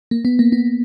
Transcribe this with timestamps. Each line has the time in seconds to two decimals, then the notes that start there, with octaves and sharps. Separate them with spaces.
0.11 A#3
0.25 B3
0.39 A#3
0.52 B3